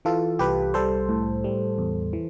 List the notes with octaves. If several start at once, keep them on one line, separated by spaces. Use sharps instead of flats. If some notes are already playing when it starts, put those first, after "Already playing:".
E3 F4 A4
C2 G4 B4
G3 A4 C5
A2
G3
E2
E3